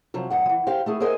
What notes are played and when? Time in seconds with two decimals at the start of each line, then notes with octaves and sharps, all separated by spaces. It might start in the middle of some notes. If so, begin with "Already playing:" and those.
0.14 C3 F3 F#3
0.30 E2 G2 F#5
0.46 E3 F3
0.67 G4 C5 F5
0.86 A3 E4 G#4
1.00 G#4 A#4 C5 D#5 E5 G#5